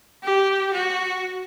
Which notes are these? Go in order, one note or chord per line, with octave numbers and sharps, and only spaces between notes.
G4
F#4